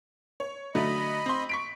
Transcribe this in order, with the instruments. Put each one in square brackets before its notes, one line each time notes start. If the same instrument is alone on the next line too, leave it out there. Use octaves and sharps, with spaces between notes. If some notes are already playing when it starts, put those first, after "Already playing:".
[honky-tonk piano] C#5
[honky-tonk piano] D3 F#3 A3 [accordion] D#5 B5
[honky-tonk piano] C4 C6
C#6 B6 D7